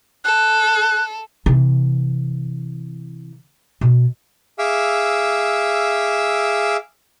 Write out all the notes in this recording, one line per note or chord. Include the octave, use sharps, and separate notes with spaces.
A4 F#6
C3 E3
B2
G#4 E5 F5 D6 E6